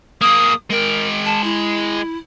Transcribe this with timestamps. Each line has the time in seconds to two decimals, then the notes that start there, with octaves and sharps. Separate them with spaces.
0.21 A#3 G#4 D#6
0.70 G#3 A#4 G5
1.25 A5
1.44 E4